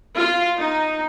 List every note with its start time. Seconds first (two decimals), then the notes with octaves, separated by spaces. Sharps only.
0.16 F4
0.57 D#4